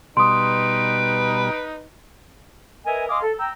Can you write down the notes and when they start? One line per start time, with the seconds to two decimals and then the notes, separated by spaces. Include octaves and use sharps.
0.17 B2 G3 D#4 B4 C6 D#6 D7
2.85 A#4 B4 D#5 E5 G#5
3.09 D#5 F5 G#5 C6 D6 D#6
3.23 A4
3.39 G5 A#5 E6